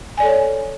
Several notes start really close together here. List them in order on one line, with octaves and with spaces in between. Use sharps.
G#5 D5 A4 C#5